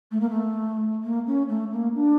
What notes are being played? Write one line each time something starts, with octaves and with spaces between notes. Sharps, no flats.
A3
A#3
A3
A#3
C#4
A3
A#3
D4